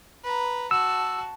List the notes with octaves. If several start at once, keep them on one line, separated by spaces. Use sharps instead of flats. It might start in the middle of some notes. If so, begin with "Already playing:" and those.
B4 A#5
F#4 A5 E6